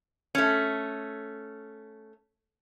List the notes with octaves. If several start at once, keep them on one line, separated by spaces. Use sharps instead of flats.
A3 C#4